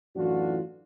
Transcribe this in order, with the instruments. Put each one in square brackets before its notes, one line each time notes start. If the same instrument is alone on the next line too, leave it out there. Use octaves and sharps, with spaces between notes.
[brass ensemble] F#2 A2 E3 D4 F4 F#4